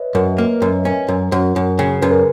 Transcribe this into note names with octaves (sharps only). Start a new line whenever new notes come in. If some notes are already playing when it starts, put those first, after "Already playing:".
Already playing: B4 C#5 D#5 E5
F#2 A#4 C#5
A#3
F#2
C#4
F#2
F#2
F#2
C#3
F#2 B4
A#4